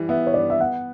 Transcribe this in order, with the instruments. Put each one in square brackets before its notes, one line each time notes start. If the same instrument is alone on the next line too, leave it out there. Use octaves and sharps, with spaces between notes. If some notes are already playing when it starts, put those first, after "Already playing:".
Already playing: [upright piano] E3 G3
[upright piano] B3 [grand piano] E5
[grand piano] C#5
[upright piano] G2 [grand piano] D5
[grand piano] E5
[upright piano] B3 [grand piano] F#5